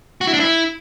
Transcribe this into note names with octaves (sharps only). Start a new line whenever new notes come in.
F#4
E4
D4
E4